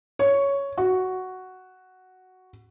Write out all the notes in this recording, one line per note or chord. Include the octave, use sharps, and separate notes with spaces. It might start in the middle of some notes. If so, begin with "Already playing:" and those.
C#5
F#4